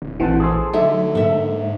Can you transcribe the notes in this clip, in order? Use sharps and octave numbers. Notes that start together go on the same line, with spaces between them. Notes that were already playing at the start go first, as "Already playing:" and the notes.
D1
A#1 A2 E3 C4 F#4 A5
G#4 A4 C5
D3 F#3 A3 D#4 A4 C#5 E5
G#2 A#3 A4 E5